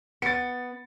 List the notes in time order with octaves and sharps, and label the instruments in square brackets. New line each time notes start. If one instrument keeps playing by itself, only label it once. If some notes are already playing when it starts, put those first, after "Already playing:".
[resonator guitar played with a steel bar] B3 [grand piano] A6 C#7